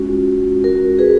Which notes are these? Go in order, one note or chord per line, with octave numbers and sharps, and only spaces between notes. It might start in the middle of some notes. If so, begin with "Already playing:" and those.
Already playing: G#3 C#4 F4 F#4
F#4 A#4
G#4 B4